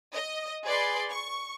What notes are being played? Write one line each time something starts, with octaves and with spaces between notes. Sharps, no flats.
D#5
G#4 B4 D5 C6
C#6